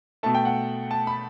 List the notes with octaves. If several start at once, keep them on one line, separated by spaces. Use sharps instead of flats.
B2 A3 A5
G5
F#5
A5
B5